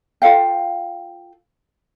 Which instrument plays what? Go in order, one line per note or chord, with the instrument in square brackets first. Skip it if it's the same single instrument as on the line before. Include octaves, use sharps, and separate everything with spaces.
[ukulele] F4 A4 F5 G5